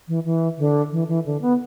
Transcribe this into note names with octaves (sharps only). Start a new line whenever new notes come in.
E3
E3
D3
E3
E3
D3
B3